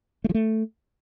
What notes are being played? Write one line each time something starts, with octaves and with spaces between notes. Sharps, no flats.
A3
F3
A3